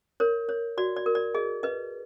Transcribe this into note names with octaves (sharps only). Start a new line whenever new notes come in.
A#4 C#5
C#5
F#4 D5
D5
A#4
D5
G#4 D#5
B4 D#5